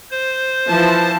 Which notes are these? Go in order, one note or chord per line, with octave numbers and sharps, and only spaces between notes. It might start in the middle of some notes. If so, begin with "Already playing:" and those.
C5
E3 F3 A5